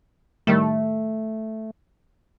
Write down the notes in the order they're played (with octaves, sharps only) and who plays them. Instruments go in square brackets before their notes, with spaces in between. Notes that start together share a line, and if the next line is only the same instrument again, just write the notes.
[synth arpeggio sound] A2 D#3 G3 [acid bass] A3